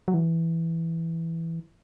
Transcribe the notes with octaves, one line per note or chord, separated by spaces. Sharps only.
F#3
E3